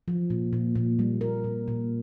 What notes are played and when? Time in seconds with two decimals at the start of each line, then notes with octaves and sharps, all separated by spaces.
0.08 F3
0.30 A#2
0.53 A#2
0.75 A#2
0.99 G3
1.21 A#4
1.44 A#2
1.68 A#2